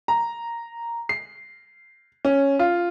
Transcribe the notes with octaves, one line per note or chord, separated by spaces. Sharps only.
A#5
C7
C#4
F4